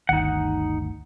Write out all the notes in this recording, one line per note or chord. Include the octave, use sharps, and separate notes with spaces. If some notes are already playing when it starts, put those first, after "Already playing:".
G1 D2 D#3 D#4 F#5